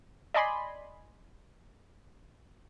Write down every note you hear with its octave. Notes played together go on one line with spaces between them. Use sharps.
D5 D#5 G#5 B5 C6